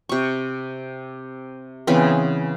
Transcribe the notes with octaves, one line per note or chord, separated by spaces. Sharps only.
C3 C#6
C#3 E3 B3 C4